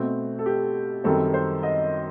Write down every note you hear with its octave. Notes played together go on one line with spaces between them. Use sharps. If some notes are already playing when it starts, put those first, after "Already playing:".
Already playing: B2 A3 C4
A4
G4
F#2 D#3 G3 C4 A4
C5
D#5